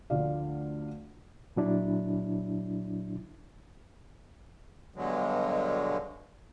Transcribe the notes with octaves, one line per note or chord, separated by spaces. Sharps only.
D2 D3 F3 A3 D5 F5
A#2 F#3 D4 E4
G2 B2 D3 F#3 G#3